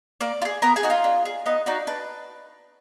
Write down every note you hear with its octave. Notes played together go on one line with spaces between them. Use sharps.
A#3 D5 D6
F4
G#4
B3 A#4 A#5
G#4 G#5
D#4 F#4
F4 F5
D4
G#4
B3 D#4 D#5
D4 D#4 F#4 D5
D4 B4